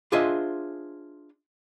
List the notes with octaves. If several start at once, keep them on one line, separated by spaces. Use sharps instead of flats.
D4 F4 G#4 C5 D#5 E5